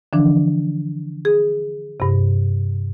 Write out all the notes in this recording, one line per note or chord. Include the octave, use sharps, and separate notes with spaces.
D3 E3 F3 D4
G#4
G2 C3